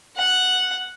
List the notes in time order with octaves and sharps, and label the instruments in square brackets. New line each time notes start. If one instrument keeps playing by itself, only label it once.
[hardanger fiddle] F#5